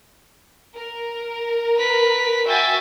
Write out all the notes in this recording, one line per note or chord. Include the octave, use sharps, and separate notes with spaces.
A#4
B4 B6
F#4 E5 G5 G#5 A6